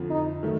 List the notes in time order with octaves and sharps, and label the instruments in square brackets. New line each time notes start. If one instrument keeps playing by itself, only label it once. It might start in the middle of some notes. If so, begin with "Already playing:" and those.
Already playing: [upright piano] F2 D3 F3
[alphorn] D#4
[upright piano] D#3 F#3 A3